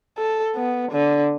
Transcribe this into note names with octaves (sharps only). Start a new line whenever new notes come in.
A4
B3
D3